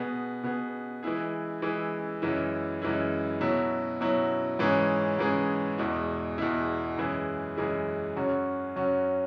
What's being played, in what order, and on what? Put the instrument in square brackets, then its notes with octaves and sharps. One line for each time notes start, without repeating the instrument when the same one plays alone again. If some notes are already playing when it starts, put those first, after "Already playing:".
Already playing: [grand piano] B2 B3 G#4
B2 B3 G#4
E3 G#3 E4 G#4
E3 G#3 E4 G#4
F#2 E3 G#3 E4
F#2 E3 G#3 E4
B2 F#3 E4
B2 F#3 E4
G#2 E3 C#4 G#4
G#2 E3 C#4 G#4
E2 B2 G#3 E4
E2 B2 G#3 E4
F#2 E3 G#3 E4 G#4
F#2 E3 G#3 E4 G#4
F#2 F#3 C#4 F#4
F#2 F#3 C#4 F#4